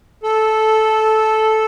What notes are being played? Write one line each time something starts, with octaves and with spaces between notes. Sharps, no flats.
A4